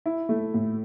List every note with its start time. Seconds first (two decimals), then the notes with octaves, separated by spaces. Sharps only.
0.06 E4
0.29 A3
0.54 A2